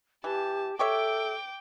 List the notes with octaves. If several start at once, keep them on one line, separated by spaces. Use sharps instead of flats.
E3 G4 A5
G4 A4 C#5 E5 G5 D6